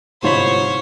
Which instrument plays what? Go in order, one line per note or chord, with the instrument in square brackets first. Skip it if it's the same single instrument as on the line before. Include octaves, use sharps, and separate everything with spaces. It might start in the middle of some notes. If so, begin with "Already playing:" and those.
[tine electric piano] G1 F4 B5 [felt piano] C2 G#2 [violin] C5 C#5